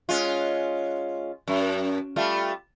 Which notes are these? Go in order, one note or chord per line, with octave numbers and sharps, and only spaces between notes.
G#3 C#4 F4
F#2
G3 A3 F4